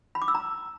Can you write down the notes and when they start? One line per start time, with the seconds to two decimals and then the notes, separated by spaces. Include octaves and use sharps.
0.15 B5
0.22 D6
0.28 E6
0.35 A#5